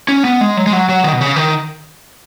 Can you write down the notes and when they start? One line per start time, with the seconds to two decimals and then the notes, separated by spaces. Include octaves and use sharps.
0.08 C#4
0.25 B3
0.41 G#3
0.57 F#3
0.67 G#3
0.73 F#3
0.89 F#3
1.04 D#3
1.13 B2
1.21 C#3
1.36 D#3